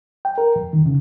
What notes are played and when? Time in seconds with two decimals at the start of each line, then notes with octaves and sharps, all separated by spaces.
0.25 G5
0.38 A#4
0.56 F2
0.73 D#3
0.86 C#3